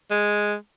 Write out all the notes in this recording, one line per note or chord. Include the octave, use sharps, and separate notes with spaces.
G#3